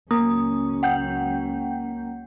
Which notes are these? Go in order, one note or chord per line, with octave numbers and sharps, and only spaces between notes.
C#2 F#3 A#3 C#4 D#6
F#5 G5 G6